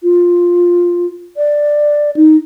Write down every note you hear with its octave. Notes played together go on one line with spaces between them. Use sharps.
F4
D5
D#4